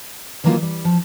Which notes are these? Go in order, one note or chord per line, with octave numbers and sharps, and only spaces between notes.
D#3 E3 F#3 A#3 D#4 F4
G3
F3